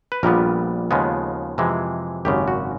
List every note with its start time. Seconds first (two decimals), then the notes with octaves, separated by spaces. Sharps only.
0.12 B4
0.23 A#1 A#2 G3 B3 A#4
0.91 D#2 C#3 F3 G#3 B3
1.58 F2 C3 E3 G#3
2.25 G#1 F#2 C#3 G4
2.48 F#4